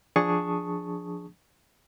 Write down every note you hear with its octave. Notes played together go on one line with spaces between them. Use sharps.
F3 D4 G#4 A5 C#6 D#6